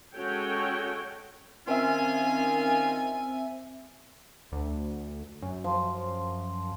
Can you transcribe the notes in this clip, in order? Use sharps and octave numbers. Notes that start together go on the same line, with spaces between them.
G#3 C#4 F#4 A4 C#5 G5
D#3 C4 C#4 F4 E5 G#5
D2
F#2
F3 C6